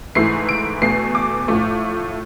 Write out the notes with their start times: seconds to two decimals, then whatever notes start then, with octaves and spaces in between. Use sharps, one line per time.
0.15 G#2 E3 A3 E4 C7
0.49 D7
0.82 E2 B2 A3 C7
1.15 D6
1.48 A2 F3 A3